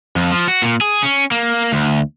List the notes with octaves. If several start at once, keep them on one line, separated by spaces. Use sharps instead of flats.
F2
F3
F#4
A#2
G#4
C#4
A#3
D2